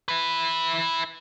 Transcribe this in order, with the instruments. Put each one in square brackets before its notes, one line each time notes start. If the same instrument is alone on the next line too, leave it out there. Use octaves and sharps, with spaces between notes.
[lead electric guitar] E4 B4